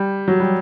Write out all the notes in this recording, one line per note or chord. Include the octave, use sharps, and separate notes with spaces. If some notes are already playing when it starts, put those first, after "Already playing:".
Already playing: G3
F#3
G3